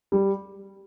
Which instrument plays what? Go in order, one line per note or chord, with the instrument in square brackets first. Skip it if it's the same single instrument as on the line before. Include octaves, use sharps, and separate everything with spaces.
[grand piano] G3